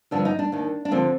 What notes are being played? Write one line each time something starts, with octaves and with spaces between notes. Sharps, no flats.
G2 D3 F3 D4
D#4
D4
D#2 D#3
D4
D3 F3 C4